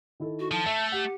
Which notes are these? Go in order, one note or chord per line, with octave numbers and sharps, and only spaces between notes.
D#3 E4 A4
F#4
F3 A5
A3 E5
G4 F#5